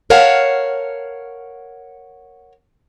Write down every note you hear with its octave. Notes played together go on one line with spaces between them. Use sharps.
A#4 C#5 F5 F#5 A5